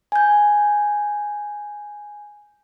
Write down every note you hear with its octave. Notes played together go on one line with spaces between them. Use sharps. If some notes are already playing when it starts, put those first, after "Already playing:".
G#5 G6